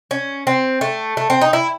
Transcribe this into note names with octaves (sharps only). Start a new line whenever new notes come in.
C#4
C4
A3
A3
C4
D#4
E4